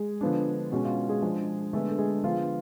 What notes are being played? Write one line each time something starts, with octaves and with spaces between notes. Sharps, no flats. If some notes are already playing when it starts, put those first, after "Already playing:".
Already playing: G#3 G#4
D3 F3 B3 D4
B2 G#3 C#4 F#4
F4
G#3 G#4
F3 G#3 D4
D3 G#3 A3 B3 D4 A4
A4
G#3 G#4
D3 F3 B3 F4